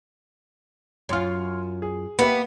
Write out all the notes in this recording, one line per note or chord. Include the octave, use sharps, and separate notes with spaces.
F#2 F4 C#5 C6 F6
G#4
A#3 B3 G4 E5